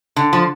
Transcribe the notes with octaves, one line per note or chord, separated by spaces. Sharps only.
D3
F3